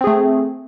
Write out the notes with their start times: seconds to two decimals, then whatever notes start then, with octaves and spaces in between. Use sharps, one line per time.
0.01 C4
0.04 G#4
0.07 A3